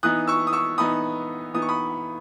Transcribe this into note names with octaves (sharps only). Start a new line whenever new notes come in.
E3 B3 D#4 D#6 F#6
C#6 E6
D#6
C#6 E6
E3 B3 D#4 B5 D#6
E3 B3 D#4 D#6
C#6
B5 D#6